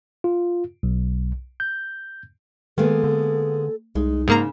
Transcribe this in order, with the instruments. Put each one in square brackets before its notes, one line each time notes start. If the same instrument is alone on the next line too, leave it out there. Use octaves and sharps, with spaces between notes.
[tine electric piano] F4
B1
G6
[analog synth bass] D#3 [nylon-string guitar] G#3 A#3 B3 [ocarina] A4
[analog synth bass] D3
[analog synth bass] C2 [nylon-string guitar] G#3 [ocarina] D#4
[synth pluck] G#2 A#3 A#5 [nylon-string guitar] C#3